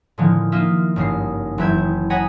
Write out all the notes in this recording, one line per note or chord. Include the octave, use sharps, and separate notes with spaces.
A2 D3 D#3 F3 G#3 B3
A#3 D#4 F4 E5
G#1 G2 C#3 D#4 C7
F#1 E3 E5 G6 G#6
C#3
C#5 D#5 F#5 G#5 A#5 B5